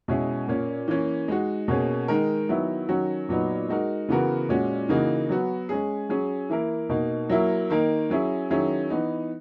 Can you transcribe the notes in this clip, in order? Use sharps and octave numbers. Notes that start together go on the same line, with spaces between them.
B2 G#3 C#4 E4 G#4
A#2 A#3 C#4
E3 A#3 C#4
G#3 D#4 F#4
B2 A#3 C#4 G#4
D#3 G#3 D#4 A#4
D#3 F#3 B3 E4
D#3 F#3 C#4 F#4
A#2 F#3 B3 D#4
G#3 D#4 F#4 A#4
C#3 E3 B3 F#4 A#4
A#2 G#3 C#4 F#4
C#3 E3 A#3 D#4 F#4
F#3 B3 F#4
G#3 C#4 G#4
F#3 C#4 G#4
E3 A#3 E4 A#4
B2 A#3 D#4
F#3 A#3 E4 A#4
D#3 A#3 D#4 A#4
F#3 C#4 E4 G#4
D#3 F#3 C#4 E4 G#4
E3 B3 D#4